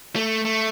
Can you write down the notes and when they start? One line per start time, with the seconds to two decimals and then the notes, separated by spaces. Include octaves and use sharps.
0.16 A3
0.45 A3